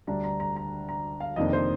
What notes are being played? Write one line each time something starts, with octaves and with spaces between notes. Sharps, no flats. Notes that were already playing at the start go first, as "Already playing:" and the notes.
D2 D3 G3 D4 A#5
A#5
A#5
A#5
A#5
F5
F1 F2 D#3 A#3 D4 D#5
C5